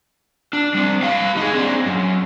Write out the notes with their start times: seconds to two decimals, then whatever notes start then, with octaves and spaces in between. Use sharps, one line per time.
0.53 D4
0.74 G3 C4
1.03 G4 F5
1.37 D#4 G#4
1.54 C4 D4
1.86 F#2